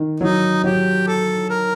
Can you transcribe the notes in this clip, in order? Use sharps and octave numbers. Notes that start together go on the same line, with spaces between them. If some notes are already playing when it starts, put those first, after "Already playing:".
Already playing: D#3
F#3 D#4
F#3 G4
A4
A#4